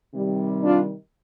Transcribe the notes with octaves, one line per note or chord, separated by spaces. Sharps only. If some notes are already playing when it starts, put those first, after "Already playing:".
C3 D#3 G3
D4 F4